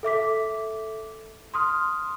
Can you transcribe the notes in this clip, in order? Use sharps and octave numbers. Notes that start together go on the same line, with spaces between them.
A4 E5 D6 B6
C6 D#6 F6